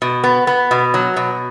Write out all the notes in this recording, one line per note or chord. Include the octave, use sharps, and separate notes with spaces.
B2
B3
B3
B2
F#3
B2